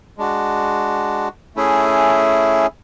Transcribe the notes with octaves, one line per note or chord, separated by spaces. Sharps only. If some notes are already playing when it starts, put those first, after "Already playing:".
G#3 D4 F#4
A3 C#4 E4 G#4